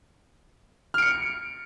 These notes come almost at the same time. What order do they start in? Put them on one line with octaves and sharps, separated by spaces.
F6 D7 C#7